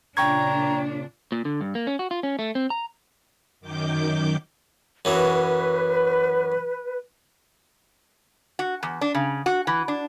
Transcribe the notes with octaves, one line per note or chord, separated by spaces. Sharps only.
A#2 C#3 D4 G5 A#5 C#6 G#6
A#2
D3
G2
A#3
C#4
F#4
F4
C#4
A3
C4
A#5
F#2 D#3 D6 G6
F#2 E3 F#3 B4
F#4
E2
D4
C#3
F#4
E3
D4